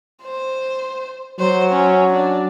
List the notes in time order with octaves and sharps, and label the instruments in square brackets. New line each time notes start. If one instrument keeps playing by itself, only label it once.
[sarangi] C5
[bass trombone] F#3 [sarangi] C5
[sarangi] C#4
D4